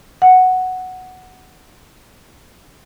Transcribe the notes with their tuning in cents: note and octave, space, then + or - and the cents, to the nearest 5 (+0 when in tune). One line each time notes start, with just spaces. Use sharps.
F#5 +0